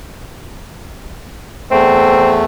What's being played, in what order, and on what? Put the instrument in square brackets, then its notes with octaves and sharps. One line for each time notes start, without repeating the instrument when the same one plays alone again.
[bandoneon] E2 A3 [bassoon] C4